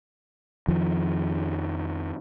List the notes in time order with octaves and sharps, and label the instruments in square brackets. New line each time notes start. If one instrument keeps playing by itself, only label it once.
[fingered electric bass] F2 D#3 F3